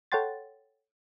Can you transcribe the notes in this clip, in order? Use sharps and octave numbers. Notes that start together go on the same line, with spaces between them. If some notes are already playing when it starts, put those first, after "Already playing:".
A4 C#5 F#5 G5 C6 A6